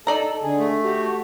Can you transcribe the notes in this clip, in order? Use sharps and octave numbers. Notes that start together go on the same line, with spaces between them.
D#4 A4 D5 A#5
D3 G#4
A3
F#4 G4